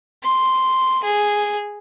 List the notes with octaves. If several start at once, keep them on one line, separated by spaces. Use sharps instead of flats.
C6
G#4